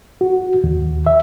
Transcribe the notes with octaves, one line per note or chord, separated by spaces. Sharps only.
F#4
D#2
E5